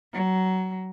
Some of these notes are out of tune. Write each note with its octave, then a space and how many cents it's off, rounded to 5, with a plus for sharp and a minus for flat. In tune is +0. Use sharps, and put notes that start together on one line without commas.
F#3 +20